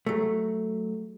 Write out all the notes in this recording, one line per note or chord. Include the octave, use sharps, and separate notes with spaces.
F#3 A3